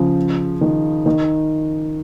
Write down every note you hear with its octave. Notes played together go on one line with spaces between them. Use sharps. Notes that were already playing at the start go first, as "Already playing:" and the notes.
Already playing: C#3 F3
D#3
D#3